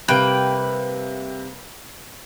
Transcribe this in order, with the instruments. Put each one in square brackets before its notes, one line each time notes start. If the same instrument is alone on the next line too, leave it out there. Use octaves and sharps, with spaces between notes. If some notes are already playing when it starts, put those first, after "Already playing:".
[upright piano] C3 G3 [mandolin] A#3 B4 G5